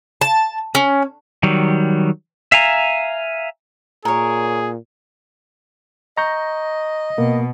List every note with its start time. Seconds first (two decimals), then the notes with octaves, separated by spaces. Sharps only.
0.21 A5
0.75 C#4
1.43 D#3 F#3 G3
2.52 E5 F5 G#5 A#5
4.05 A#2 G#4 A#4 C#5
6.17 D#5 A#5 C#6 G6
7.18 B2 A#3